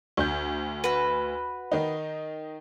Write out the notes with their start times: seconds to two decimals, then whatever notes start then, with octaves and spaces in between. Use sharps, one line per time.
0.17 D2 G6
0.84 F#4 B4
1.72 D#3 D#4